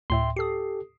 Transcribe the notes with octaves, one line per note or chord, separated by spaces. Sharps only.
D2 A2 E5 G5 C6
G4 A4 D#6 C7